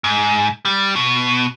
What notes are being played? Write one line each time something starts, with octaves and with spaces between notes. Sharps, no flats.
G#2
G3
B2